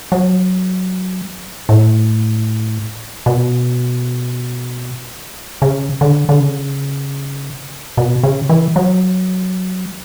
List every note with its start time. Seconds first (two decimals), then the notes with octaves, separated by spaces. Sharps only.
0.12 F#3
1.69 A2
3.26 B2
5.62 C#3
6.01 D3
6.29 D3
6.40 C#3
7.97 B2
8.23 C#3
8.49 E3
8.76 F#3